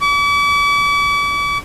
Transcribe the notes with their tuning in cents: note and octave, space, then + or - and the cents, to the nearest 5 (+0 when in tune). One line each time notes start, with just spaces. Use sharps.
D6 -45